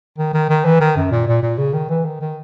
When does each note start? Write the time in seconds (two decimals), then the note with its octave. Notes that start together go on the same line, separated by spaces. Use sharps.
0.18 D#3
0.33 D#3
0.49 D#3
0.65 E3
0.80 D#3
0.96 F#2
1.11 A#2
1.27 A#2
1.42 A#2
1.58 C#3
1.73 D#3
1.89 E3
2.05 D#3
2.21 D#3